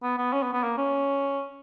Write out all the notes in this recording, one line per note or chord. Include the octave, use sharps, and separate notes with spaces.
B3
B3
C#4
B3
B3
A#3
C#4